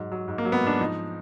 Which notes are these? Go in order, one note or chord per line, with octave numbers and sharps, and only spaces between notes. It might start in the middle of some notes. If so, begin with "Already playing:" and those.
Already playing: G#2 F#3
F#3
G#2
A#3
F#3
B3
G#2 D4
F3 D#4